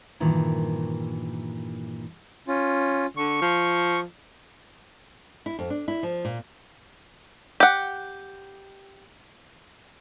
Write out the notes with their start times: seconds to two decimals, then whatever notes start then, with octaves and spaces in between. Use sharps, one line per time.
0.20 G2 A#2 D#3 E3
2.48 C#4 F4
3.17 D3 C#6
3.42 F3
5.46 E4
5.59 F2
5.70 D4
5.88 E4
6.03 F3
6.25 A#2
7.60 G4 F#5